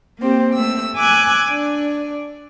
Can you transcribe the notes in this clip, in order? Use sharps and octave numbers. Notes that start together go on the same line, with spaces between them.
A#3 C4 G4
A3 E6
G#5 D6 E6 F#6 G#6
D4